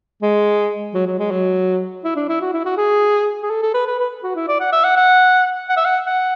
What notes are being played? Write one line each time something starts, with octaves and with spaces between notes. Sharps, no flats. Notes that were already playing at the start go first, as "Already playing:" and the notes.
G#3
F#3
F#3
G#3
F#3
E4
D4
E4
F#4
E4
F#4
G#4
G#4
A4
A4
B4
B4
B4
F#4
E4
D5
F#5
E5
F#5
F#5
F#5
E5
F#5
F#5